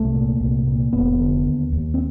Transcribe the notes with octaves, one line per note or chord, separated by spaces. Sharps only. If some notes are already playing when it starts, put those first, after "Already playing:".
Already playing: C2 A3
A#2
C2
A#2
F1 B3
D3
D#2
D#2
C4